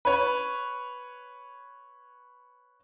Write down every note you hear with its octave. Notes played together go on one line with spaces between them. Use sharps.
B4 C#5